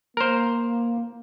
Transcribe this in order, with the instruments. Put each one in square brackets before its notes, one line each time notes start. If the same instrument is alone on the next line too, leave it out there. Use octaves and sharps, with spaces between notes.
[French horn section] A#3 [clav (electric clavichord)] A#4 C5